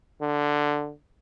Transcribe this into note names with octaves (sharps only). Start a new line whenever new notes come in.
D3